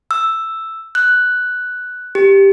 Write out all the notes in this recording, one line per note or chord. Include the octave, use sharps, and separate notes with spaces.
E6
F#6
G4